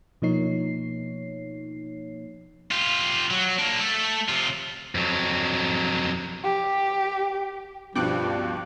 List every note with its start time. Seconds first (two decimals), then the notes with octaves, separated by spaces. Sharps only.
0.22 B2 F3 A#3 D#4 C#5 C7
2.71 F4 G4
3.31 F#3
3.59 A#3 D4
3.81 A3 A4
4.29 C3 F4
4.95 F2 F#3
6.44 G4
7.95 C#2 G2 B2 F3 G3 G5 D6 F#6